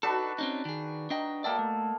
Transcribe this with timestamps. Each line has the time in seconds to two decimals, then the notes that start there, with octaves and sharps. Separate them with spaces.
0.03 D4 D#4 F#4 A4 B4
0.38 C4 C#4 D#4
0.65 D#3 G#4
1.10 D4 D#4 D#5 G5
1.44 A#3 A4 D5 E5 G5
1.59 A3